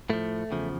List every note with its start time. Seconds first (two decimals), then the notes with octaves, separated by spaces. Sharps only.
0.10 A2 F3 A3
0.51 E2 C#3 F3